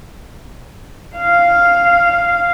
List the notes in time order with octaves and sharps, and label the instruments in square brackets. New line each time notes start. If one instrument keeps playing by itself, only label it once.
[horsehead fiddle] F5